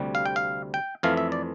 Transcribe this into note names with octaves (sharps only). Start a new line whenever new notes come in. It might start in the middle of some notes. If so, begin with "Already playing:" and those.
Already playing: D2 C3 G3
F5
G5
F5
G5
F2 E3 A3 F5
E5
D5